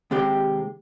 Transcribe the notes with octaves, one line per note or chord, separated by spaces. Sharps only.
D#2 C3 G#3 G4